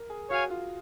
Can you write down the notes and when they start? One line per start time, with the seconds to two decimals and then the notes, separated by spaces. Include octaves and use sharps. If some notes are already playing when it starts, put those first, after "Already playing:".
Already playing: A#4
0.10 G#4
0.29 F#4 C#5 F5 G#5
0.50 F4